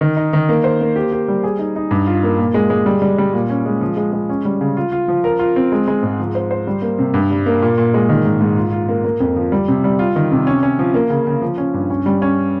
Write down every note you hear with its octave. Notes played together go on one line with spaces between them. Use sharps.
D#3
D#4
D#3
A#3
C5
A#3
G4
G4
G3
G#4
D#4
D#4
G2
F4
A#3
A#2
G#3
G#3
G3
G3
G3
A#2
C#4
G#3
F3
G#3
G#3
C#4
G3
C#3
F4
F4
F3
A#4
F4
C4
G#3
G#3
G#2
F3
C5
C5
G3
A#3
C3
G2
G3
A#3
A#2
A#2
G#3
D#3
G#2
G#2
F4
F4
A#3
A#3
F2
F3
G3
C3
G3
F4
D#3
C3
C#4
C#4
F3
A#3
C#3
C#3
F3
C#4
G2
C#4
G3
C#4